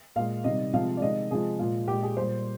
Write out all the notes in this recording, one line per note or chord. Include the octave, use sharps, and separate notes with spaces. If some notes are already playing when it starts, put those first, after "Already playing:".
A#2 G#3 F5
C3 D#3 G3 D#5
C3 F3 G#3 F5
D5
C3 D#3 G#3 D#5
C3 F3 G#3 G#4
A#2 G#3 F4
A#2 G#3 G4
G#4
A#2 G3 C5